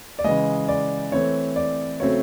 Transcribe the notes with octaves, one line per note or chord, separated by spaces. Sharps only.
D5
C#3 E3 G#3 D#5
D5
E3 A3 C4 C#5
D5
C#3 F#3 A3 C4 C#5